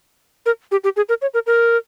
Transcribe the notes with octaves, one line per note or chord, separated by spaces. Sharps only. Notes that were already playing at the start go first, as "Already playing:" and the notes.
A#4
G4
G4
G#4
A#4
C#5
A#4
A#4